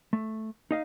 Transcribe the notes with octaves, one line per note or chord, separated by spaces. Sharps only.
A3
D#4 D#5 F5